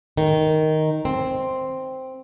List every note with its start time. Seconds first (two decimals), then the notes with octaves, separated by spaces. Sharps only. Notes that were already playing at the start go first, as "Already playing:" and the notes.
0.17 D#3
1.05 C4